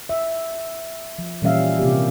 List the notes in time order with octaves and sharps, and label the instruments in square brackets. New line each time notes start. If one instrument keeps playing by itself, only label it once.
[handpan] E5
F3
A#2 E3 G3 C#4 E5 F5
C3 A#3 G4